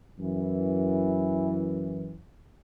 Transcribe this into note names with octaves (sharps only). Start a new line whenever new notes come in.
F#2 E3